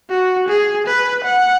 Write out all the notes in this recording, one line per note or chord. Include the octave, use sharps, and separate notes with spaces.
F#4
G#4
B4
F#5